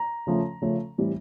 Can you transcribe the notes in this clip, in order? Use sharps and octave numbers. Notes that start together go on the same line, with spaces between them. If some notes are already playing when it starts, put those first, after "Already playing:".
Already playing: A#5
C#3 F3 A3 C#4
C#3 F3 A3 C#4
A2 E3 G3 C4